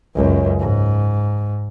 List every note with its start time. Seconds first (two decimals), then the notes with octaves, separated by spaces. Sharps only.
0.15 C#2 F#2
0.59 G#2